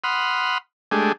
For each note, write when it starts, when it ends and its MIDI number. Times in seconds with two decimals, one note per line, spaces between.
0.04 0.58 78
0.04 0.58 83
0.04 0.58 84
0.04 0.58 87
0.04 0.58 89
0.91 1.12 56
0.91 1.12 57
0.91 1.12 62
0.91 1.12 67
0.91 1.12 68